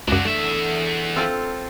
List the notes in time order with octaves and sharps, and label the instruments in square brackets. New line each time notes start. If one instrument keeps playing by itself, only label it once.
[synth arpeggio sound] C#2 F#2 [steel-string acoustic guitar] C#3 G#3 [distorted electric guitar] D4 F#4
[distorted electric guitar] E2 E5 [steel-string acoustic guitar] A3 D4
[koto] C4 F4 A4